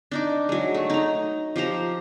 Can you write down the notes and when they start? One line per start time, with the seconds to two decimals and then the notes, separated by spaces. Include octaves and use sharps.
0.11 D4 D#4 D6
0.49 F#3 G#3
0.74 A3
0.90 D#4 A#5
1.56 F3 G4 C5 A#5